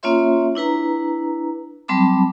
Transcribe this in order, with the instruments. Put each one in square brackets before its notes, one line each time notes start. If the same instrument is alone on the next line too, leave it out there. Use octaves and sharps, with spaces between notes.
[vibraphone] A#3 C#4 F4 C#5 E5 C6
D4 E4 B4 A#5
F#3 G3 C4 A5 B5 D6